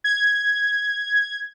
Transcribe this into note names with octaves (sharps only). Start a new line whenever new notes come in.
G#6